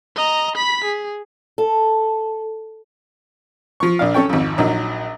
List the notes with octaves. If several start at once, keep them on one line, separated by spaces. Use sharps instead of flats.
D#5 A#5
B5 B6
G#4
A4
F3 C#6
A#1 D4 F5
C#4 A4 C#5 G5
G#1 F2
A#1 F#3 D#4